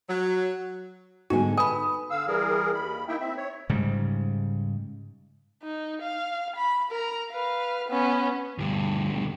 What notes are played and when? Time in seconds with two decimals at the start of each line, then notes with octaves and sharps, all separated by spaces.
0.09 F#3
1.30 G#2 D3 G3 B3 D#4 F#4 G#5
1.58 B4 G#5 B5 D#6
2.10 D3 F5 E6
2.27 E3 G3 G#4 A#4
2.74 D#2 B5
3.08 A#3 D#4 E4 E5 G5
3.20 C4 E5
3.37 C#5
3.69 G#2 C#3 G3
5.63 D#4
6.02 F5
6.56 B5
6.91 A#4 A#5
7.30 B4 F5
7.89 B3 C#4
8.58 D2 G2